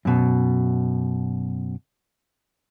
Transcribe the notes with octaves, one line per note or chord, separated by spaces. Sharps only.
F#2 B2